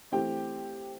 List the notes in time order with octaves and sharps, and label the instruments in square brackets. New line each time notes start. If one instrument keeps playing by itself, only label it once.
[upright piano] E3 A3 C4 G4 G5